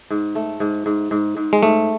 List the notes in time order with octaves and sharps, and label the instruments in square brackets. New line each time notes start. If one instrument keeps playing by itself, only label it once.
[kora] G#2
A3
G#2
G#2
G#2
G#2
[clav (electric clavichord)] G#3
[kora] G#2 [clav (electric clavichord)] A3